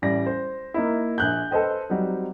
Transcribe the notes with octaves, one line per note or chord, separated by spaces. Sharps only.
A1 G3 D5 A#6
C5
A#3 D#4 E4
A#1 F#6 G6
A4 B4 C5 D#5 G5
F#3 G3 C4 D#4